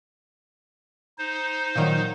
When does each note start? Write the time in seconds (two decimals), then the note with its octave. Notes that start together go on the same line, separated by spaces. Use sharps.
1.18 D#4 C5
1.75 A#2 D#3 F#3